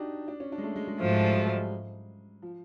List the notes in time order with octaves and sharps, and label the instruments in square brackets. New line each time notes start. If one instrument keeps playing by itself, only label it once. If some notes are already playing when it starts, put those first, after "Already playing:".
Already playing: [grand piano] D4 D#4 F#4 G4
D4
C#4
D4
G#3
A3
G#3
G#3
[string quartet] G#2 F3 A3 [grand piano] F#3
[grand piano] G#3
G3
F#3
F3